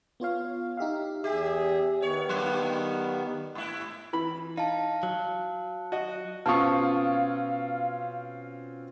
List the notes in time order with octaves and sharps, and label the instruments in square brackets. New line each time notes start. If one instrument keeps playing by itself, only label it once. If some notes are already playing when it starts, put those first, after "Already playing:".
[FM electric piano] B3 F4 C#5 F5
D#4 G4 E5 F5
[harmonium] E2 G#4 E5 [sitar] G4
[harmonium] D#3 B3 [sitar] C#5
[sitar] G2 F#3
G#2 E4
[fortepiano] E3 B5
[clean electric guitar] D#4 [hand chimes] F5 A5
[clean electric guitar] F#3
[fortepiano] F#4 D#5
[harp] B2 C#6 [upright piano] C4 C#4 F4 [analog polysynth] F5 [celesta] A5 D#6